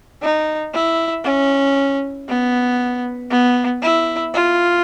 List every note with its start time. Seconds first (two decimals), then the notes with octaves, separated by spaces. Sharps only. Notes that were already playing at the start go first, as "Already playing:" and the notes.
0.22 D#4
0.74 E4
1.25 C#4
2.28 B3
3.31 B3
3.82 E4
4.33 F4